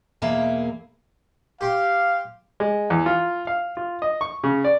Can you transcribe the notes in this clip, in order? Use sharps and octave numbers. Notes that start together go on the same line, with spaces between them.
E2 B2 A#3 G#4 E5 F5
G4 F5 C6
G#3
E2
F4
F5
F4
D#5
C#6
C#3
D5